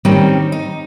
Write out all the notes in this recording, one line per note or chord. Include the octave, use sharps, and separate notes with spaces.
D#3 G3 C4 C#4 D#4
D#4